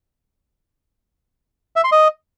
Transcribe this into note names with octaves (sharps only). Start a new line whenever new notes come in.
E5
C6
D#5